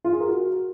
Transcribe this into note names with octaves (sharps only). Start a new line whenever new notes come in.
F4
G#4
A#4
F#4